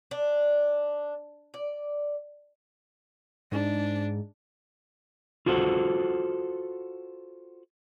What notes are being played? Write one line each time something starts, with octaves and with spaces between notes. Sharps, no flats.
D4
D5
G#2 D4
F4 F#4 A4 C5 D#5 F#5